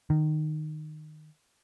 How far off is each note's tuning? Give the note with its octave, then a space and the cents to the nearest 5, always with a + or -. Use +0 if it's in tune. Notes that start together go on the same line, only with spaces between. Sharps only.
D#3 -15